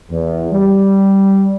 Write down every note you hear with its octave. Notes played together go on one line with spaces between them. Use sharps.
E2
G3